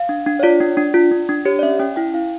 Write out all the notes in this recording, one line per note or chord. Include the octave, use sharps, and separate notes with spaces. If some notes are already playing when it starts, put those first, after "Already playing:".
Already playing: F5
D4
D4
C#5
F4 D5
D4
D4
F4
D4
D4
G4 C#5
D5
C#4 E5
C#4 G5
E4 G5
E4 F5